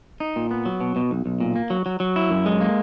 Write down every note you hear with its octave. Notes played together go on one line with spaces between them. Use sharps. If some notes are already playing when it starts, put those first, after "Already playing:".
D#4
A#2
B3
F#3
B2
B2
B1
B1
A#2
A#3
F#3
F#3
F#3
E4
F#2
G#3
A#3